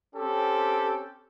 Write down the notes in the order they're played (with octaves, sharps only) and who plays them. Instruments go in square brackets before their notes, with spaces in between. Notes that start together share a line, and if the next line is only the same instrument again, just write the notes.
[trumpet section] C4 C#4 G4 A4